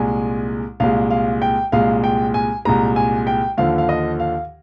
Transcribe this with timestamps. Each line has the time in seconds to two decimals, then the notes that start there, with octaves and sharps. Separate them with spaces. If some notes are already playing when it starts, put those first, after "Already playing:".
Already playing: C2 A#2 G#3 G#5
0.80 C2 A#2 G#3 F5
1.10 F5
1.42 G5
1.72 C2 A#2 G#3 F5
2.04 G5
2.34 G#5
2.65 C2 A#2 G#3 A#5
2.96 G#5
3.27 G5
3.57 D#2 D3 F3 F5
3.78 F5
3.89 D#5
4.20 F5